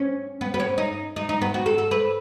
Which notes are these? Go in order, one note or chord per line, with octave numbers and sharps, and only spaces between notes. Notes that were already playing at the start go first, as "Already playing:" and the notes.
Already playing: C#4
B3
B3
C#4
D#4
D#4
D#4
B3
F#4
A4
A4
B4